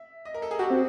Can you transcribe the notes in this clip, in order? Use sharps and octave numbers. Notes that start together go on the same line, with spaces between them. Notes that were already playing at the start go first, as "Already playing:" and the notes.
Already playing: E5
D#5
A#4
A4
G#4
F#4 G4
C4